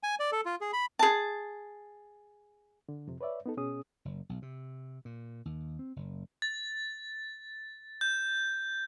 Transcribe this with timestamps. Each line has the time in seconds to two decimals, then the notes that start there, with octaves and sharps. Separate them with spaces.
0.03 G#5
0.20 D5
0.32 A4
0.46 F4
0.61 G#4
0.73 B5
0.99 G#4 A5
2.89 D3
3.07 F2 C3
3.21 B4 C#5 D5 E5
3.46 B3 D#4 A4
3.57 B2 C#4 G#4 D#6
4.05 F#1
4.29 B1
4.42 C3
5.05 A#2
5.45 D#2
5.79 C4
5.96 F#1
6.42 A6
8.01 G6